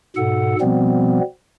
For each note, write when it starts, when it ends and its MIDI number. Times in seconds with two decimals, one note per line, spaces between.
0.16 0.56 44
0.16 0.56 47
0.16 0.56 69
0.16 0.56 78
0.61 1.20 47
0.61 1.20 53
0.61 1.20 55
0.61 1.20 59
0.61 1.20 60